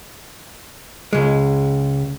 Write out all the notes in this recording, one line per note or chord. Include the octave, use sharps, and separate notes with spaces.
C#2 G#3